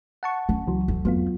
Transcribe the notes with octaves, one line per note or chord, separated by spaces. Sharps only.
F#5 A5 C#6
C#4
C#2 E3 F#3
D2
F2 F#3 B3 F4